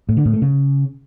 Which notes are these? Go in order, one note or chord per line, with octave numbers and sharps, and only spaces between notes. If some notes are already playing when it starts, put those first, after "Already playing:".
A2
D3
A2
A3
C#3